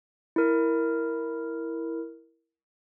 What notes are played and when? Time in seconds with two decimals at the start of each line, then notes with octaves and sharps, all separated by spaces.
0.36 E4 A#4